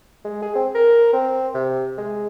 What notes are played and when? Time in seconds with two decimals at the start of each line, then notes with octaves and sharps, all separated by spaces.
0.25 G#3
0.42 G#4
0.55 C4
0.75 A#4
1.13 C4
1.54 C3
1.98 G#3